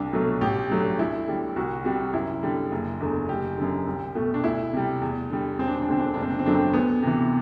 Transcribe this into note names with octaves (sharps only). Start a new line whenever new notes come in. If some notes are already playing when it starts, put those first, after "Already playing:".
Already playing: C2 D4
B2 F#3 A3
A1 G4
G2 F#3 A3
D2 E4
D3 G3
C2 F#4
C3 G3 F#4
F#2 E4
D3 G3
F#1
E2 D3 A3
F#1 G4
F#2 D3
C2
B2 A3
D4
D2 E4
C3 G3
E2
D3 G3
E1 C4
D4
C4
D4
D2 D3 C4
D4
C4
F#1 D4
C4
D4
C4
F#2 D3 F#3 A3 D4
C4
D2 B3
C3 E3